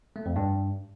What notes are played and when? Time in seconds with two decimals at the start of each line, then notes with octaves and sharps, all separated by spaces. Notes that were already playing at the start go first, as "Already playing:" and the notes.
0.16 A3
0.26 F2
0.36 G2